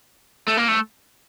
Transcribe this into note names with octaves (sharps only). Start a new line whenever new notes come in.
A3
A#3
A3